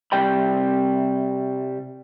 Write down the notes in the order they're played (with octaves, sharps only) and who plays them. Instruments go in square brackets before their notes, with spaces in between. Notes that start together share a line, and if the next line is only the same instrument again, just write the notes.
[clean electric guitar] C2 G#2 C3 G3 G5 B5